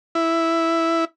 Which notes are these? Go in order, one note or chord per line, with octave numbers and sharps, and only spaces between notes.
E4